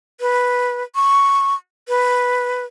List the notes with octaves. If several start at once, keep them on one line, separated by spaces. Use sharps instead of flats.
B4
C#6
B4